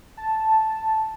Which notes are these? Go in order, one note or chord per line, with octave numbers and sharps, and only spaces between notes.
A5